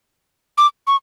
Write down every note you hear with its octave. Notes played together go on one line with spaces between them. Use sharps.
D6
C#6